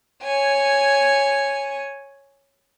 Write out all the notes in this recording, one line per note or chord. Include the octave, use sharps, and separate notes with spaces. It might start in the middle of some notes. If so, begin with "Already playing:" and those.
C#5 G#5